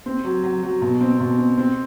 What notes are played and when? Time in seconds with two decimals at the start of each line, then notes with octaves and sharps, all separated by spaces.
0.06 C4
0.24 F#3
0.43 F#3
0.63 F#3
0.82 B2
1.01 C4
1.20 B2
1.38 C4
1.57 C4